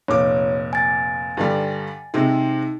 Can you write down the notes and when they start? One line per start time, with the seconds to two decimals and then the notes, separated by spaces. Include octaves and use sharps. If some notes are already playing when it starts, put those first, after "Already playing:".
0.08 F1 A#2 C#5 D6
0.73 G#5 A6
1.37 G2 D3 G3
2.14 C3 G#3 C4 D#4